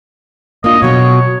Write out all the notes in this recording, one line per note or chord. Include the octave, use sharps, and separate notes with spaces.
A#3 D4 F4 D#5
B2 F#3 C#5